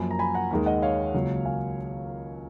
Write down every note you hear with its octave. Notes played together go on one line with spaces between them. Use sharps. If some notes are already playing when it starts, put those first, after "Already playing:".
Already playing: F#2 F3 A#3 G#5 B5
A#5
G#5 B5
F#5 A#5
D#2 D#3 G#3
D#5 F#5
C#5 F5
C#2 C#3 F#3 A#3
F5 G#5